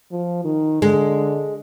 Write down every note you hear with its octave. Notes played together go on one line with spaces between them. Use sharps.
F3
D#3
D3 G#3